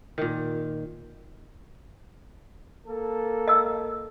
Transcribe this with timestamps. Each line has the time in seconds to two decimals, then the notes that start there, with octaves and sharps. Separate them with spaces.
0.18 A#2 D#3
2.86 A#3 A4
3.48 D#5 E6